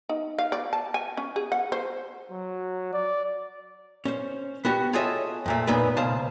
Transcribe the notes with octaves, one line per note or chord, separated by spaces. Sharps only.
D#4
F5
D5
A5
G#5
C#4
G#4
F#5
C5
F#3
D5
C#4 C5
B3 F#4 G4
F4 G#4 A4 C#5 D#5 E5
F2 A#2 A3
F#2 A#2 B3 D#4 B4
C#2 B2 C5 F5 A5